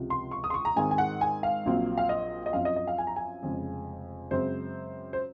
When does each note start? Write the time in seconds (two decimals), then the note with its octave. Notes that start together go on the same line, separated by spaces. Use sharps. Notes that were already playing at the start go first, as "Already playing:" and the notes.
Already playing: C#2 C3 F3
0.10 C6
0.31 C#6
0.44 D#6
0.50 C6
0.54 C#6
0.65 A#5
0.76 G#2 D#3 G#3 C4 G#5
0.91 G#5
0.98 F#5
1.21 G#5
1.43 F5
1.65 A#1 A#2 F#3 C4
1.97 F5
2.09 D#5
2.46 D#5
2.53 F#2 F3 C4 F5
2.65 D#5
2.76 D#5
2.87 F5
2.98 G#5
3.07 A#5
3.16 G#5
3.43 F1 F2 C#3 F3 G#3
4.31 F#2 C#3 G#3 C4 C5
5.13 C5